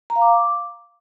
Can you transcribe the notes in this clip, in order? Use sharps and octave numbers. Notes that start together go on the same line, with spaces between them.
A#5
F5
D6